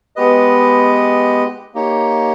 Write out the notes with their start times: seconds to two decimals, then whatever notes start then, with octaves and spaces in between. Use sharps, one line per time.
0.16 G#3 B3 G4 B4 D#5
1.74 A#3 D#4 G4 C#5